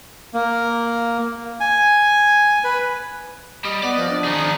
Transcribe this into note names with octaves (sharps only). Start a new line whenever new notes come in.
A#3
G#5
B4
G3 D#5
B3 D5
F3
D4
D#3 D#4 G#4
F3